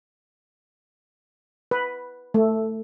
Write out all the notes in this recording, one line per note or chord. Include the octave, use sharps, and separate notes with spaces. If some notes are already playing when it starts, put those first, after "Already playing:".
B4
A3